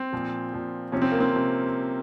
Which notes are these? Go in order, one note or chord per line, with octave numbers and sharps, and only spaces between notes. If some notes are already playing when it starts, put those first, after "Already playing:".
Already playing: C4
A#2 F3
A#2 F3
C3 F3 C#4
C4
A#3
C4
C3 F3